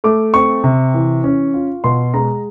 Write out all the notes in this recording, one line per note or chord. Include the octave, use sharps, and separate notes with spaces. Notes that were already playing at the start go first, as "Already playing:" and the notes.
A3 D6
C4 C#6
C3
E3
C#4
F4
B2 C6
G#3 A#5